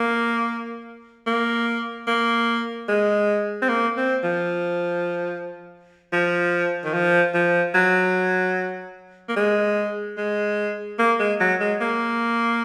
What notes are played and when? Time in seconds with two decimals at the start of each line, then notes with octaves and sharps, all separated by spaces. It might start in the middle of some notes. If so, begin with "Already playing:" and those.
Already playing: A#3
1.27 A#3
2.07 A#3
2.88 G#3
3.62 C4
3.69 A#3
3.97 C4
4.23 F3
6.13 F3
6.84 D#3
6.94 F3
7.34 F3
7.75 F#3
9.29 A#3
9.36 G#3
10.17 G#3
10.99 A#3
11.19 G#3
11.40 F#3
11.60 G#3
11.81 A#3